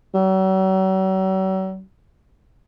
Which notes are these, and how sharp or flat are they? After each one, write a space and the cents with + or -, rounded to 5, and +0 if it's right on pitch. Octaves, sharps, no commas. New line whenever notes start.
F#3 +45